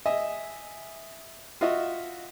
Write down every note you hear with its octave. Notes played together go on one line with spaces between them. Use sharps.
D#5 E5 G#5
F4 F#4 D#5 E5